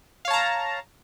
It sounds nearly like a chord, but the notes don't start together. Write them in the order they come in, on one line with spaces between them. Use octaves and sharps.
F5 C#5 A5 A#5